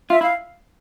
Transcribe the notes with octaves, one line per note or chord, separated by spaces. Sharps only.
F4 E5
E4 F5